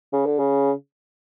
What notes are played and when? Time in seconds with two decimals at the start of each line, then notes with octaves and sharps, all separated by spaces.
0.13 C#3
0.26 D3
0.39 C#3